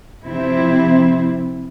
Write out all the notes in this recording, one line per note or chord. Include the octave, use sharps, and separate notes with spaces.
C3 F3 C4 E4